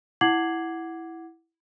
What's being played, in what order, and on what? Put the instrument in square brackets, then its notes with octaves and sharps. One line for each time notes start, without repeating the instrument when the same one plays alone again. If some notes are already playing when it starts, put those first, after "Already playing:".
[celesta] E4 F#5 D6 G#6 C7 F#7